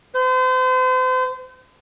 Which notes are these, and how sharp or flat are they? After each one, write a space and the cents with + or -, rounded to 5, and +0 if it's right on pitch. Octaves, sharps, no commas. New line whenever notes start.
C5 -40